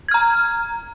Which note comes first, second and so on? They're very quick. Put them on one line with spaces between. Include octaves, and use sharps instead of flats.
G#6 F6 A#5